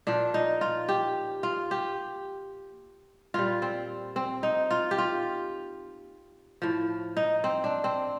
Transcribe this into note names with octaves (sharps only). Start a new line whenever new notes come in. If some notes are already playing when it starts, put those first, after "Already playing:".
A#2 F3 D4
D#4
F4
G4
F4
G4
A#2 G3 F4
C4
C4
D#4
F4
G4
F4
A2 F3
D#4
C4
D4
C4